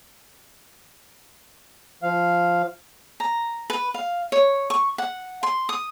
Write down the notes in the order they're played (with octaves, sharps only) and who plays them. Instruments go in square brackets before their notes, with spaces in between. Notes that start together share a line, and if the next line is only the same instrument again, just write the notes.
[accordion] F3 F5
[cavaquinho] A#5
B4
F5
C#5
C#6
F#5
C6
D#6